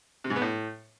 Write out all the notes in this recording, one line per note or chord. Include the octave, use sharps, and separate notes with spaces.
C3
G#2
B3
A2